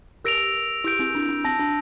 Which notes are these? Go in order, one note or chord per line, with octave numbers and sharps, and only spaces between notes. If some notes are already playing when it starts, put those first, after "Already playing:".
G4 A#4 E6 A#6 D7 F7
E4 G4 E6 G6 D7
C4 E4
D4
D4
C4 A5 E6 A#6
D4